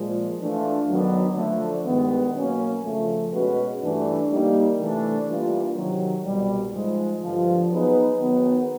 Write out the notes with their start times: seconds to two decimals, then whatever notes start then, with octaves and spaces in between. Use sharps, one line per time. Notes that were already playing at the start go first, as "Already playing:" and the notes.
Already playing: A#2 F3 G#3
0.40 E3 A3 D4 F4
0.88 F#2 D#3 F#3 B3 D4
1.37 D3 F3 A3
1.86 G2 D#3 G#3 B3
2.35 B2 F#3 A#3 C#4
2.83 F2 C#3 F3 A3
3.32 B2 G#3 C#4 F#4 B4
3.81 G2 E3 A3 D4
4.29 G3 A#3 D#4
4.78 C3 E3 A3 D4
5.27 E3 G3 A#3 D4 F4
5.75 C3 D#3 F#3
6.24 C2 B2 G3
6.73 G#2 F3 G#3
7.22 G2 D3 F3
7.71 F#3 B3 D#4 G#4 B4
8.19 D#3 F#3 B3 D#4 G#4